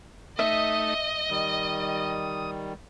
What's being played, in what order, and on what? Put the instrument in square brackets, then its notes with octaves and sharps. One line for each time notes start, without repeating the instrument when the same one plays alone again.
[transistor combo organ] A3 D#4 D#6 [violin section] D#5 [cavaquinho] E5
[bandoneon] D#3 G3 [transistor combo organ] D#6